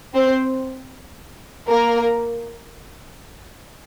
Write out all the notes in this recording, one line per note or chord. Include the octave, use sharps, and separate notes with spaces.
C4 C5
A#3 A#4